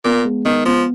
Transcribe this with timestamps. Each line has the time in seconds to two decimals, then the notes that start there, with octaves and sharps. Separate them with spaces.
0.04 A#2 B3
0.25 G#3
0.45 D#3 B3
0.65 F3 B3